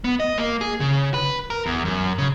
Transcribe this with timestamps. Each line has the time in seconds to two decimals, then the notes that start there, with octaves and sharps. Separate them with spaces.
0.04 B3
0.20 D#5
0.38 A#3
0.61 G#4
0.80 C#3
1.14 B4
1.50 A#4
1.66 E2
1.85 F#2
2.18 C#3